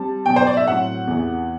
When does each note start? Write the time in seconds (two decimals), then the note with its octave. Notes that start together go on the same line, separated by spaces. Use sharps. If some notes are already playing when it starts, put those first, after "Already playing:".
Already playing: G3 C4 A5
0.26 B2 F#3 B3 G5
0.36 C5
0.47 D5
0.57 E5
0.67 A2 F#3 C4 F#5
1.07 E2 C3 E3 B3